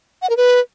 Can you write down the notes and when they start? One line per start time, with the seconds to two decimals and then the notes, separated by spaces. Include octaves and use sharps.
0.22 F#5
0.30 A#4
0.37 B4